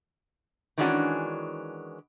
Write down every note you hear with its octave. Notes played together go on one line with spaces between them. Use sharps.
D#3 E3 G#3 C#4 D4 F#4